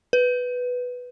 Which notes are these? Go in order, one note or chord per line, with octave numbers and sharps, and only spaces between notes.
B4